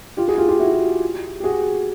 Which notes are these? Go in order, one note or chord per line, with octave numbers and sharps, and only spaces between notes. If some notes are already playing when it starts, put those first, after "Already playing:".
F4 G4
F#4 G#4
F4 G4
F4 G4
E4 F#4
G4
F#4 G#4